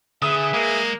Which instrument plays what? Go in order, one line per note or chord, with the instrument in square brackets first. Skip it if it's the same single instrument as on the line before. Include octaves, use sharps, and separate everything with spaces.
[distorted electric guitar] D3 [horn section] G#4 B4 E5 [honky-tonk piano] D#6
[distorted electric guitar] G#3 [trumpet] A#3